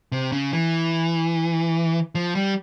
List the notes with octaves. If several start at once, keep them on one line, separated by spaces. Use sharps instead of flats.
C3
C#3
E3
F3
G3